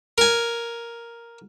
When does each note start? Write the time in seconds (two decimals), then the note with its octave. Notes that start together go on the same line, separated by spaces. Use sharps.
0.18 A#4 G#5